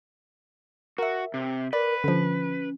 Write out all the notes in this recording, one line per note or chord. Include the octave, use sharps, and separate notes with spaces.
F#4 A#4 E5
C3
A#4 B4 D5
D3 F3 C#4